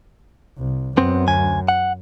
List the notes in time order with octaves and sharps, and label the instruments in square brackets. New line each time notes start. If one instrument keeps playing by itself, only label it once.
[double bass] C2
[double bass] F#2 [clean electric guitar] B3 C4
[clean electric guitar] D2 G#5
F#5